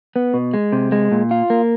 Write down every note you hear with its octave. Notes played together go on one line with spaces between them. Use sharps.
B3
B2
G#3
C3
G#3
A#2
F4
A#3